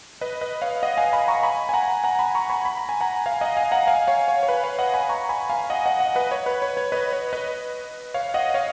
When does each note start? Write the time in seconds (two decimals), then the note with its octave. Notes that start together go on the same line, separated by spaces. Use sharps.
0.21 B4 D#5
0.41 B4 D#5
0.62 C#5 F5
0.82 D#5 F#5
0.98 F5 G#5
1.13 G#5 B5
1.28 A#5 C#6
1.43 G#5 B5
1.69 G#5
1.73 F#5 A#5
2.04 F#5 A#5
2.19 G#5 B5
2.35 A#5 C#6
2.50 G#5 B5
2.65 B5
2.77 A#5
2.89 G#5
3.01 F#5 A#5
3.26 F5 G#5
3.41 D#5 F#5
3.57 F5 G#5
3.72 F#5 A#5
3.87 F5 G#5
4.07 C#5 F5
4.28 C#5
4.43 C#5
4.48 B4
4.64 C#5 F5
4.78 D#5 F#5
4.94 G#5 B5
5.09 A#5 C#6
5.29 G#5 B5
5.50 F5 G#5
5.70 D#5 F#5
5.86 D#5 F#5
6.00 D#5 F#5
6.15 B4 D#5
6.31 C#5
6.46 B4
6.62 C#5
6.77 C#5
6.92 B4 D#5
7.13 C#5
7.33 B4 D#5
8.14 C#5 F5
8.34 D#5 F#5
8.54 C#5 F5